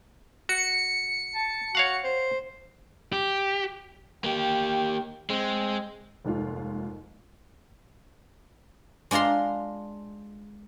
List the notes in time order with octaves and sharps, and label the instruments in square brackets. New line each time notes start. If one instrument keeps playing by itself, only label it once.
[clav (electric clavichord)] F#4 [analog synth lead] C#7
[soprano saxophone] A5
[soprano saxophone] F#4 [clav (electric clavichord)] C#5 F5 F#5
[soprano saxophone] C5
[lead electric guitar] G4
[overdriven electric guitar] A#3 G4 [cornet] G5
[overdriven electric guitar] G#3 [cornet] C4
[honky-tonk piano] F1 D#2 G#2 F4
[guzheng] G#3 D4 F4 A#5 C6